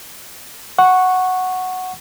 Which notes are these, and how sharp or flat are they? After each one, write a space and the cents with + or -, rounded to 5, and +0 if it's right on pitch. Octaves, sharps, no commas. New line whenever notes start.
F#5 +0 C#6 -5